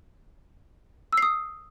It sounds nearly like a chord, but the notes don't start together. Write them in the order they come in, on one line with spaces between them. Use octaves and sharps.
E6 C7 D#6